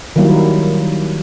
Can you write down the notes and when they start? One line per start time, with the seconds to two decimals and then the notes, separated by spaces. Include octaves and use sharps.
0.16 D#3 F#3 G3 A#3 E4